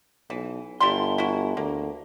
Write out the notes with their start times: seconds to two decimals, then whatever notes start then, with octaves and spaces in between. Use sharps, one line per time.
0.30 B1 E3
0.80 G1 G3 E4 C6
1.18 E4 F#4
1.57 D2 A#3